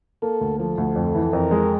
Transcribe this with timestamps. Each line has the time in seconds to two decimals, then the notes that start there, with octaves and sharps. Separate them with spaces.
0.22 A#3 A4
0.41 D2
0.59 F3 A4
0.78 D2
0.96 F2
1.15 E3
1.33 F2 A#4
1.51 G#3